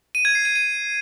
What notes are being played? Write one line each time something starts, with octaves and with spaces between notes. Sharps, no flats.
D#7
G#6
C7
D#7
D#7